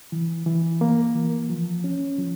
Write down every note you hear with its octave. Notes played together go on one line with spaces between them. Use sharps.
E3
E3
A#3
E3
F3
C#4
F3